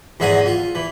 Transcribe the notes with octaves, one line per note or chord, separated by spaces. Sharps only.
E2 G#2 E5 F#5 G#5
F4
E3